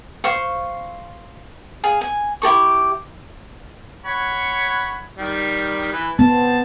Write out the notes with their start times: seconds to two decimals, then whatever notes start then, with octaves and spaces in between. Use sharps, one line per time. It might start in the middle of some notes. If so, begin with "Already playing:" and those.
0.24 C5 F5 C#6
1.84 G#4 F5
2.01 G#5
2.42 E4 G4 A4 C#6
4.05 C#5 F#5 B5
5.18 D#3 G3
5.93 E3 B4
6.19 B3 C4 A5